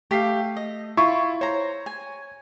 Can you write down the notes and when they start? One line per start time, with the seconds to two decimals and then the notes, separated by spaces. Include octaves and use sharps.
0.11 A3 G4 F5 B6 C7
0.57 D#5
0.97 E4 F4 B5 C#6
1.41 C5 C#5 A#5
1.86 G#5